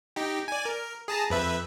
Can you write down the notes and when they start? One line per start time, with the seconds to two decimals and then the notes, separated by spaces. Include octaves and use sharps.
0.16 D#4 G4
0.48 D5 G#5
0.65 A#4
1.08 G#4 A5 A#5
1.30 F2 B4 E5